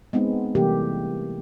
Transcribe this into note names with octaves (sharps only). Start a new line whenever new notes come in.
G#3 B3 C4 D#4
C3 E3 G3 A3 A#3 G4